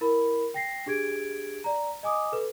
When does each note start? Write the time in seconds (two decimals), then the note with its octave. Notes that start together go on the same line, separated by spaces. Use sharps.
0.01 E4 A#4 B5
0.54 G5 A#6 C7
0.86 D4 G4 G#4 G#6 D7
1.64 D5 A#5
2.03 D#5 G#5 D6 D#6
2.32 A4 B4